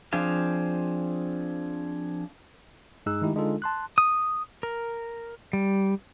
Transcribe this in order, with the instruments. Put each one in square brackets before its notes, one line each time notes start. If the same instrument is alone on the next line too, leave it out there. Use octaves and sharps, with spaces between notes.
[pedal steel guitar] F3 C4 D4 G#4 F5
[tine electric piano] G2 G#3 D#4 G#4 E6 F#6
D#3 G#3 A3 D#4 E4 G4
D3 G#3 D4 D#4 F4 A4
A5 C6 F#6
[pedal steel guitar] D#6
A#4
G3